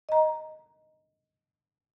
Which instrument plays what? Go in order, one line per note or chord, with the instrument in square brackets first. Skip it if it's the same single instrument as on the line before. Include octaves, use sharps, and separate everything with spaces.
[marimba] D#5 A#5